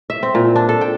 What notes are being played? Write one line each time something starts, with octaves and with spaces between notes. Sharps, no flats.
E5
C4
A#2
D4
A4
G5